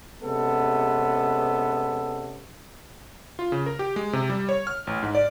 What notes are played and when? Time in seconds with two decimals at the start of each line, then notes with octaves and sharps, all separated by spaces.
0.23 C3 G#3 B3 C#4 A4
3.39 F4
3.52 C#3
3.66 A#4
3.79 G4
3.96 G#3
4.13 C3
4.30 G3
4.49 C#5
4.67 F6
4.87 A1
5.03 G#2
5.15 D5